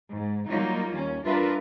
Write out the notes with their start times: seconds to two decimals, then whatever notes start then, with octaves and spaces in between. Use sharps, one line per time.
0.13 G#2
0.48 F#3 G3 A#3 D#4 F4
0.94 D#2 C#4
1.26 G3 D4 F4 A#4 B4 E5